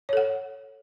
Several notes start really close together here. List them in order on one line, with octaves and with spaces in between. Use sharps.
C#5 A4 F#5